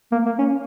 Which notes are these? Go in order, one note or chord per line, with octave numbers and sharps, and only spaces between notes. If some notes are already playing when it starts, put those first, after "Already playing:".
A#3
A#3
C#4